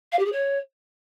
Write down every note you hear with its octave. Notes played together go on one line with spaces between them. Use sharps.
F5
G4
G#4
C#5